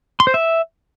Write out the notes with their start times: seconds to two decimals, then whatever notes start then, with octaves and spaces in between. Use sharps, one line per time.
0.20 C6
0.27 C5
0.34 E5